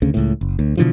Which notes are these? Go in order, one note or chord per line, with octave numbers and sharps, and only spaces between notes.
D2 C#3
C#2 A2
F#1
D2
B2 D3 E3 F3